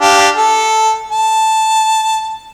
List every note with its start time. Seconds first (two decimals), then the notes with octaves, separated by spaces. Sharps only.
0.01 D4 G4 F5
0.37 A4
1.12 A5